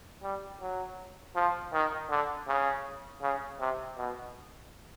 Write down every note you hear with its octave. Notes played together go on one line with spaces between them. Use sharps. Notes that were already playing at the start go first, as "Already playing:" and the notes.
G3
F#3
F3
D#3
D3
C#3
C#3
C3
B2